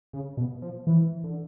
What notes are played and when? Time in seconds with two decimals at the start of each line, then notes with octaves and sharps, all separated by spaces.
0.13 C#3
0.37 B2
0.62 F3
0.87 E3
1.24 D3